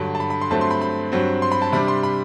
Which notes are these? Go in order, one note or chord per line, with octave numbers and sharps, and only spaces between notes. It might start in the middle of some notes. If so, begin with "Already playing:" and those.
Already playing: G2 D3 F#3 A5
A5
B5
B5
C6
G2 F#3 A3 C4 A5
C6
B5
B5
G2 F#3 C4
C6
B5
A5
C3 G3 D4 B5
C6
B5